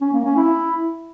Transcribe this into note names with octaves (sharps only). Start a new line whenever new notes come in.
C#4
A#3
C#4
E4